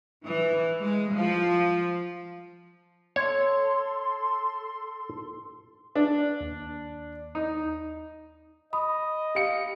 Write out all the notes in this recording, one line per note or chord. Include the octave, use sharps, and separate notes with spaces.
E3
G#3
F3
A4 C#5 C6
D4
D#2
D#4
D#5 B5 D#6
G4 F5 C#7